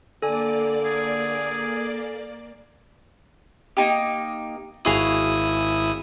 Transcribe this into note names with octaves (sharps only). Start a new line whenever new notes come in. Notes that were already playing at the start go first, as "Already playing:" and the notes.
D3 A#3 A4 D5 G#5
G#4
A#3 D#4 G4
G#1 E4 F#4 G#4 F5 D#6